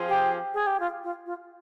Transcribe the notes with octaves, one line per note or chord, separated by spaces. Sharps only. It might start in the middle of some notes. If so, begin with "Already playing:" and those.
Already playing: F3 C4 F4 G#4
G4
G#4
G4
F4
F4
F4